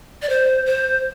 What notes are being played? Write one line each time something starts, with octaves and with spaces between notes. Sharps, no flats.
D5
C5
C5